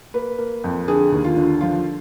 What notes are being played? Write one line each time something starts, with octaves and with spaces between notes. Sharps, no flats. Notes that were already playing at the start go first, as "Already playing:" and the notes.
A#3 B4
A#3
F2
D3 G#4
D#2
F4
D3
F3 F4